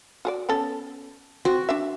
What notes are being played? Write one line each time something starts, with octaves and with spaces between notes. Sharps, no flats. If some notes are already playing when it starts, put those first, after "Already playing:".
F#4 G#4 D5
B3 C#4 A4
C4 F#4
D4 E5